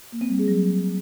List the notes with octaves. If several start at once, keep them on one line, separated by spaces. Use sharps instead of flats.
A#3
C4
G3
G#4
F#3